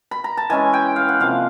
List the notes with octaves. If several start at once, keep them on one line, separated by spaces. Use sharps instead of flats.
B5
A#5
A5
E3 G#3 C#4 E4 G#5
G5
F5
F#5
C3 F3 A#3 F5